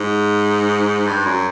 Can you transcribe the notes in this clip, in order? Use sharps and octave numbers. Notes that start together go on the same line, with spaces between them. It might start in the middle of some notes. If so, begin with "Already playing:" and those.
Already playing: G#2
G2
F#2